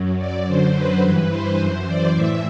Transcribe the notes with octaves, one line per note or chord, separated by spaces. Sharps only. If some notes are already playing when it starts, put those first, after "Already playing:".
Already playing: F#2 F#3
D5
F#2 D3 F#3 C5
B4
G2 E3
C5
F#2 E3
D5
A2 E3 E5